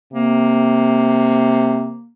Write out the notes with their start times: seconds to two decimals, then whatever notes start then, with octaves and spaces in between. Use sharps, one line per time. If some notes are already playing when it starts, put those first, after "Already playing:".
0.13 C3 A#3